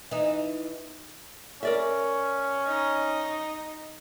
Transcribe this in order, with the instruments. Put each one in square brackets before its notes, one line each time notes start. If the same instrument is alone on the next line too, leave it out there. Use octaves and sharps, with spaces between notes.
[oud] E3 D#4
[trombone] C#4 [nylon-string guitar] A#4 D5 E5
[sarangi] D#4